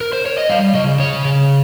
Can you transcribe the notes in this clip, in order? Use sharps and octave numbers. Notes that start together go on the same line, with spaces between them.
A#4
C5
C#5
D#5
G3 F5
C#3 D#5
C#3 C#5
C#3